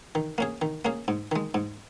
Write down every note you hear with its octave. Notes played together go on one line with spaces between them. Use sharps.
D#3
A#3 C#4 G#4
D#3
A#3 C#4 G#4
G#2
D#3 G#3
G#2